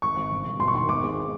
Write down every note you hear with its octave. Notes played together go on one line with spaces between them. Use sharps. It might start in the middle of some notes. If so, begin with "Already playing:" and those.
G#1 C#6
G#1
G1
G1
E1 C6
C#6
D#3 C6
G#1 D6
G#3